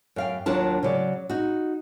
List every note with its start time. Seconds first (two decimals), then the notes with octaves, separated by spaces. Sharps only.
0.16 F#2 F5 G5
0.46 D#2 F#3 D4 F4 A#4 A5
0.83 C#3 F#3 D5
1.30 D#4 F#4